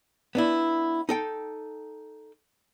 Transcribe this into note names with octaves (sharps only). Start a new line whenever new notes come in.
B3 D4 E4
D#4 A4 G5